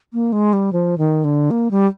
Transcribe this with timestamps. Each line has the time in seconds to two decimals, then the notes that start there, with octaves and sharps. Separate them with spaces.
0.13 A#3
0.32 G#3
0.53 G3
0.73 F3
0.98 D#3
1.24 D3
1.51 A#3
1.71 G3